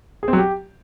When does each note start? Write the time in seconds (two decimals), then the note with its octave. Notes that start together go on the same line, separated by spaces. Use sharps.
0.23 G#4
0.28 C4
0.33 F#3
0.38 G4